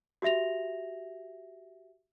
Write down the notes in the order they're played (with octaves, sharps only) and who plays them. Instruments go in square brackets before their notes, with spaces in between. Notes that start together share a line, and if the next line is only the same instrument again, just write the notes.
[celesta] F#4 G4 E5 A#6 F7